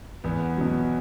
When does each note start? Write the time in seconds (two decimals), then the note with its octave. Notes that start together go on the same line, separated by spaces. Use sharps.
0.24 E2 B3
0.57 B2 F#3